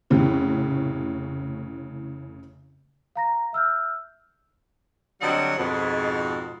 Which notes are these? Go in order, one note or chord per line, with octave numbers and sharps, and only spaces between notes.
F1 A2 C#3 E3
F5 A#5 A#6
E5 E6 F6 G6
D3 F#3 G3 C4 D#5 F#5
F2 G#2 B2